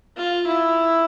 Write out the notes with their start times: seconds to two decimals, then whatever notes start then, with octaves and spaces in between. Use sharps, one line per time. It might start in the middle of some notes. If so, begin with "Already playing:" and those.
0.17 F4
0.47 E4